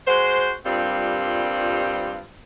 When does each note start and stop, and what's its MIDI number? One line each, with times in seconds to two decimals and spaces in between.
0.07 0.51 56
0.07 0.51 66
0.07 0.51 72
0.65 2.20 43
0.65 2.20 46
0.65 2.20 55
0.65 2.20 60
0.65 2.20 65